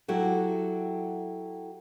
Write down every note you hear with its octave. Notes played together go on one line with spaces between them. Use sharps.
F#3 E4 F#4 G4 A4